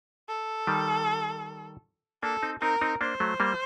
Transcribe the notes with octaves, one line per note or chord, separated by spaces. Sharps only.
A4
D#3 G3
A#3 D4 A4
C4 D#4
C4 D#4 A#4
C4 D#4
A#3 D4 C5
F#3 A3
G3 A#3